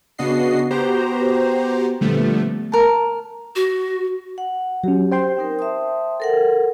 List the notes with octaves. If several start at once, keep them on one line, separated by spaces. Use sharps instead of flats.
C#3 B3 D4 F#4 D#5 C7
B3 F#4 G4 C5 A#5
A#2 D3 F3 G3 A3 B3
A#4 A5
F#4
F#5
F#3 C#4 G4
C5 G5 C6
C4 D#4 A#4
E5 A5 D#6
A4 A#4 F#5